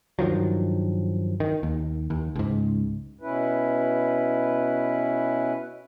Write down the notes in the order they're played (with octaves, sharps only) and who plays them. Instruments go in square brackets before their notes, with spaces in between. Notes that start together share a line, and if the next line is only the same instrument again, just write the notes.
[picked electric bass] G2 D#3 F3 F#3
D#3
D#2
D#2
C#2 G#2
[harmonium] B2 C#4 E4 B4